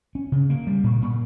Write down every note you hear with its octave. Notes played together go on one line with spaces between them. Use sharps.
C#4
C#3
A#3
G3
A#2
A#2